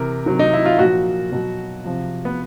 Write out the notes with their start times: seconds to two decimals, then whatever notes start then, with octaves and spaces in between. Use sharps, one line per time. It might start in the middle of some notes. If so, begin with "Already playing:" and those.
Already playing: C3 E3 A#4
0.26 C3 D#3 F#3
0.39 D#4
0.53 E4
0.65 F4
0.79 A#2 F3 F#4
1.32 B2 F#3
1.84 C3 F3
2.25 B3